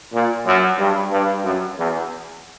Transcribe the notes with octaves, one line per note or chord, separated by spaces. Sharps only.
A#2
F#2
G2
G2
F#2
E2